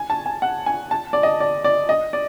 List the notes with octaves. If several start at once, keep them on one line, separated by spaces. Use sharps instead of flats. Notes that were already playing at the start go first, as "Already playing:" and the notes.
Already playing: G#5
A5
G#5
F#5
G#5
A5
D5
D#5
D5
D5
D#5
D5